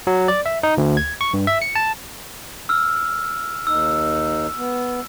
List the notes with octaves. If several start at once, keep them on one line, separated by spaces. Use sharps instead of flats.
F#3
D5
E5
D#4
D2
G#6
C#6
G2
E5
C#7
A5
E6 F6
D#2 D#4 E6
B3